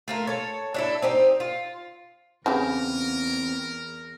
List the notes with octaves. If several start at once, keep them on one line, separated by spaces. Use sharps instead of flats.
A3 F4 A#4
A4 C#5
D4 E4 A4
C4 D#4 G4
F4
E2 C#3 B3 C4 G4 A#4